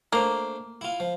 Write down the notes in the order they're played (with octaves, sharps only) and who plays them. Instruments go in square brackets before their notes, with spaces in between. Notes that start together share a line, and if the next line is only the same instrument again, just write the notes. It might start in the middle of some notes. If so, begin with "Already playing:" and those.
[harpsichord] A3 D4 C5 [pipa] A#3
[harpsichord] E4 F4
F3